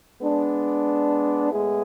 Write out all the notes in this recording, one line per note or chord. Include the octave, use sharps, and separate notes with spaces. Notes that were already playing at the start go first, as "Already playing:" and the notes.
G#3 B3 D4
A2 G#3 B3 E4 G#4